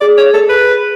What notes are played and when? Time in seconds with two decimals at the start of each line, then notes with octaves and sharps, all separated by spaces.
0.01 G#4 D5
0.17 C#5
0.34 A4
0.49 B4